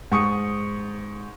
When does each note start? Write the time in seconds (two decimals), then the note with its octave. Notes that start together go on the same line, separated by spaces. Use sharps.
0.12 G#2 C#6 D#6 C#7